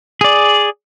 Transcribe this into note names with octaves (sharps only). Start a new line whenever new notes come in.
G#4 D5